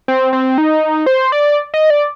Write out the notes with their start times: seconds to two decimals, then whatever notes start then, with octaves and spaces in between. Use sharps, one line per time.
0.08 C4
0.33 C4
0.58 D#4
1.06 C5
1.32 D5
1.74 D#5
1.90 D5